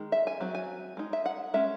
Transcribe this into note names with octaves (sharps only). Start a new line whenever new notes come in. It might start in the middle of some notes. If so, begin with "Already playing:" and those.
Already playing: D#3 G#3
E5
G#5
F#3 C4
G#5
G#3 D#4
E5
F#5
G#3 C#4 E5